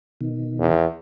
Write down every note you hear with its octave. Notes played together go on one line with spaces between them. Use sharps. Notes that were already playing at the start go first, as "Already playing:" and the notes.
B2 D#3
E2